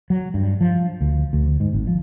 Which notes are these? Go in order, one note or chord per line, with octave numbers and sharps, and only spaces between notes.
F#3
G2
F3
D2
D2
G#2
G#1
F3